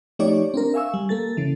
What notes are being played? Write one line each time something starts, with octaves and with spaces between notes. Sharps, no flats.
F3 A3 D#4 G4 C#5 D5
C4 D4 A#4
E5 F5 G#5 C#6 E6
G3
A#3 A4 A6
C#3 E3